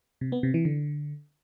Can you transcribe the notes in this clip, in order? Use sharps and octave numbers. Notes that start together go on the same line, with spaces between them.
C3
B3
C3
E3
D3